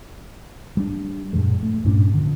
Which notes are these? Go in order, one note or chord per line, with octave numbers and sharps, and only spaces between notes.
G3 D4
F#2 A#2 F3 G#3
A3
G2 A#2 C#4 D4
D3 F3